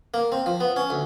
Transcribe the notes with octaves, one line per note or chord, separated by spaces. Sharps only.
A#3
C4
F3
B3
C#4
D2